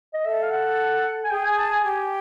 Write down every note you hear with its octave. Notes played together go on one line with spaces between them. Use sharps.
D#5
A4 E5
F5
F#5
G#5
G#4 G5
G#5
A5
G#5
G4 G#5